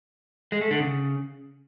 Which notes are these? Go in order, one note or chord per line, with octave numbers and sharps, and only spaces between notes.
G#3
A3
D3
C#3